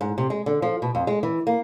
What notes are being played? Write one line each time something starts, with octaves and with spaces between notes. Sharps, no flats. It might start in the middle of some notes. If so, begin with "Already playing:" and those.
G#2
C3
G#3
D3
F3
B2
F2
G#3
E3
A#3